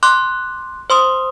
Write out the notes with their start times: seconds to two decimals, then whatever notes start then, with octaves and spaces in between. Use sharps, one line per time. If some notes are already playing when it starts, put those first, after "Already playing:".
0.03 C6 D6 F#6
0.90 C5 C6 D#6